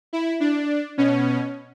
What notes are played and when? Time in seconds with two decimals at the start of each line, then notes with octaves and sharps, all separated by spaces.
0.13 E4
0.40 D4
0.98 B2 C#4